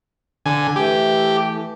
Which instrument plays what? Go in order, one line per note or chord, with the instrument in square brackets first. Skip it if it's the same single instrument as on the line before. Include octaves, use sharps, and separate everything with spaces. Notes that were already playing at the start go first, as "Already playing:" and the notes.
[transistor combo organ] D3 G#5
[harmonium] E3 A3 [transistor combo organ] G4